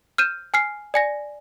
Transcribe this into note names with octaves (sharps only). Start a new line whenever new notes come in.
F6 G6 D#7 E7
G#5 F6 C7
D5 G#5 A#6